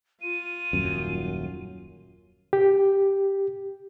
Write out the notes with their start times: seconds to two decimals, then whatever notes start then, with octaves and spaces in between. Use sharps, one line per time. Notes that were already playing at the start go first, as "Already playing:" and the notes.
0.22 F4 D#7
0.73 D#1 F#2
2.53 G4